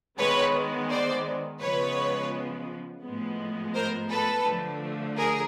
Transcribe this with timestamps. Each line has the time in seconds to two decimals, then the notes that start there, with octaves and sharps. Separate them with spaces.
0.18 D#3 G#3 B3 B4 C#5
0.90 C5 D5
1.60 C#3 F3 G#3 B3 B4 C#5
3.02 A2 F3 G#3 B3
3.74 A#4 C5
4.09 A4 B4
4.45 D3 F3 A3
5.17 G#4 A#4